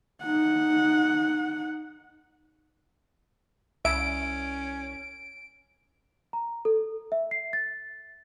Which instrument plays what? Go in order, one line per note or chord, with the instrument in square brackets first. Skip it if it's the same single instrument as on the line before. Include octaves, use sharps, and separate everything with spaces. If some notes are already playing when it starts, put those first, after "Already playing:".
[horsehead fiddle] D#4 F#5
[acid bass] C2 [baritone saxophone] C#4 [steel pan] E5 [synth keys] D7
[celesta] A#5
A4
E5
C7
A6